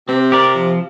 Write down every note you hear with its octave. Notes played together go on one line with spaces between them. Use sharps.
C3 C4
G4 A#4 D5
F3